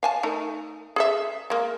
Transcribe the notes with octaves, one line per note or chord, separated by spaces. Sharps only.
F5 G#5 A5
A3 D#4 A#4
G#4 A4 E5
G#3 A#3